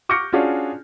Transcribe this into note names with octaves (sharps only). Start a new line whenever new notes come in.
C#6 D6 F6 G6 A#6 C#7
C#4 D4 F4 F#4 G#4